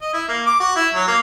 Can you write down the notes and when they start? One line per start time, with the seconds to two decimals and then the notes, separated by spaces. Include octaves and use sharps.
0.02 D#5
0.14 E4
0.28 A#3
0.46 D6
0.60 F#4
0.76 E4
0.95 F#3
1.08 A#3